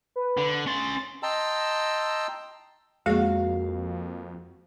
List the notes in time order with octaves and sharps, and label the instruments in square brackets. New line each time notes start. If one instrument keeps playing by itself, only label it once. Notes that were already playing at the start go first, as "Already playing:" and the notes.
[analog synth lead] B4
[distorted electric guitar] D3
[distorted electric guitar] C#4 C6 [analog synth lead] A6
[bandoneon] D#5 G5 A5 A#5 C6 E6
[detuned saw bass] F2 [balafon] G#3 G#4 [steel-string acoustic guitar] A#3 F5 [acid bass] F#4